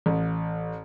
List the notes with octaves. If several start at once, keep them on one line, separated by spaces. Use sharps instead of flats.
A1